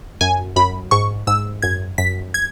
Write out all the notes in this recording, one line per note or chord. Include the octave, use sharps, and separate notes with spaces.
F#2 G#5
F#2 B5
G#2 C#6
G#2 E6
F#2 G#6
F#2 B6
G#6